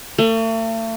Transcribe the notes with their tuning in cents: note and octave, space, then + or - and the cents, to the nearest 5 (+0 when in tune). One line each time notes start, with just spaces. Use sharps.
A3 +40